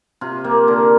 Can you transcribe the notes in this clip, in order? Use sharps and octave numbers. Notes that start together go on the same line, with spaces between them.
C3 F4
A#3 G4
D3 A#4